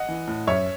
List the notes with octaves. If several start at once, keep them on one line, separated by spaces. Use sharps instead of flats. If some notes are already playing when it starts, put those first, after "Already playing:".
Already playing: D#5 F#5
E3
A2
F#2 C#5 E5